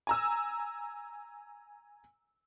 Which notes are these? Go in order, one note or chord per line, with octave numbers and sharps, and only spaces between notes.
G#5 A#5 E6